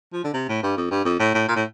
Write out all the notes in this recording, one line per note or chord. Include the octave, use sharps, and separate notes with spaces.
F3
D3
C3
A2
G2
F2
G2
F2
A2
A2
A#2
A2